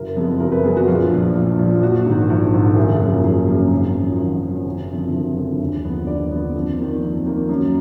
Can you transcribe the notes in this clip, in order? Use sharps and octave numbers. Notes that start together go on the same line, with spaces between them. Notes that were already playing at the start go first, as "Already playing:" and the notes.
Already playing: F#1 A#4
F2 F3 G#3 B3
F#1 A#4
B4
F2 F3 G#3 B3 G#4
F#4
A#1 F4
A#2 F3
A#1
A#2 F3
A#1 F#4
G#2 D#3
A#1
G#2 D#3
F#1 G#4
F#2 F3 A#3
F#1 G#4
F#2 F3 A#3
G#1
F#2 F3
G#1
F#2 F3
F#1
F2 D3
F#1
F2 D3
D#2
D3 F3 B3
D#2 D5
D3 F3 B3
F2
D#3 A#3
F2
D#3 A#3
F#2